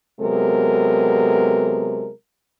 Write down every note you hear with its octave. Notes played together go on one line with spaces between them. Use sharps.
C3 F#3 G#3 B3 A4 A#4